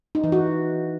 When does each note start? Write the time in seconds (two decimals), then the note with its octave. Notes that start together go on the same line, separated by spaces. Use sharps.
0.15 D#4
0.24 E3
0.32 F#4